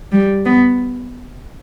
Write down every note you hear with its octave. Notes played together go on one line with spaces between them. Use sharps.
G3
B3